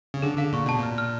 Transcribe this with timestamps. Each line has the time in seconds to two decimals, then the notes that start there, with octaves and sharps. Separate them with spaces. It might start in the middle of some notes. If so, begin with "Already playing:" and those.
0.14 C#3
0.22 D3 G#4
0.38 D3 F5
0.53 A#2 C#6
0.66 B2 A5
0.78 A#2
0.83 F6
0.98 F6